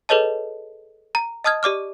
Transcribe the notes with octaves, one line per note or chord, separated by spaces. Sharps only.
G#4 A4 B4 C#5 D#5 A5
A#5
D#5 A5 D#6 F6 G#6
G4 D5 D6 F6